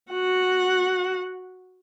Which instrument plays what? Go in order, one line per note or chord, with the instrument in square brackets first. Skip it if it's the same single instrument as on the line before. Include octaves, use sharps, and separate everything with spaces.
[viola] F#4 F#5